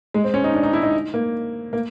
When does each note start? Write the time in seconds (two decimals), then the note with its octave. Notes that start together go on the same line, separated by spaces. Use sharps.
0.14 G#3
0.24 C4
0.34 C#4
0.44 D#4
0.54 D4
0.63 D#4
0.73 E4
0.83 D#4
1.14 A#3
1.73 A#3